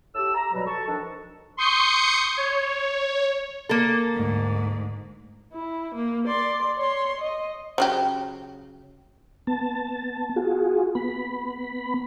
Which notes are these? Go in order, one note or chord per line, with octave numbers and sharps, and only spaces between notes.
A2 G4 A5 E6
A#5
B2 F#3 G3
A4 A5 C#6
D#3 F3 D4 A4
C6 C#6 D#6 G6 C7 C#7
C#5
A#3 A4
D2 G#2
E4
A#3
D5 C6
C#5 C6
D#5
C#3 F#3 G4
B3 A5
F4 F#4 G#4
B3 B5